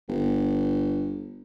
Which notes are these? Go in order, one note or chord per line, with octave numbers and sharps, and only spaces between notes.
G1